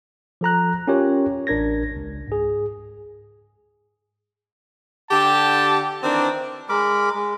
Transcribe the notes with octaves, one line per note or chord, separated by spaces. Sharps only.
F3 A4 A#5 F#6
C#4 F4 G4 A#4 C#5
A1 D4 A#4 G#6 A#6
C#2
G#2 G#4
D3 G4 A5
D#3 E3 C4 D4
G#3 A#4 B5 D6
G#3